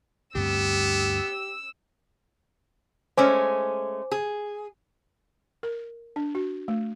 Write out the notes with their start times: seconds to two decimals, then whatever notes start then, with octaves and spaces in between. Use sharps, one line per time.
0.35 D2 G2 B3 C4 G4 E6
3.17 G#3 A3 C#4 C5 G#5 D6
4.11 G#4
5.63 A#4
6.16 D4
6.35 F#4
6.68 A3